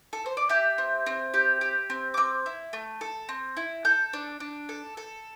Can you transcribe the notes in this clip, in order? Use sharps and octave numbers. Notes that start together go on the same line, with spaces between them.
A4
C5
D5
G4 E5
C4
C4
G4
G4
C4
D6
C4 E6
E4
A3
A4
C4
E4
A4 G6
D4
D4
A4
A4